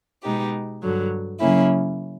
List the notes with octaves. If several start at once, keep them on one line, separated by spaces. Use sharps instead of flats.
B2 G#3 B3 D#4 G4
G2 D3 F#3
C#3 F#3 A#3 C#4 E4